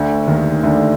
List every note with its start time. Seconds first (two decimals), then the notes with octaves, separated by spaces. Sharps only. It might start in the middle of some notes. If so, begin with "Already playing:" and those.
Already playing: D2 D3
0.27 D#2 D#3
0.63 D2 D3